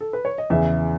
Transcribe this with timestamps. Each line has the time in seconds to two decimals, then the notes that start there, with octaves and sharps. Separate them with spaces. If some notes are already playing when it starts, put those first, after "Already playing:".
0.01 A4
0.13 B4
0.25 C#5
0.38 D#5
0.50 E2 C#3 E3 E5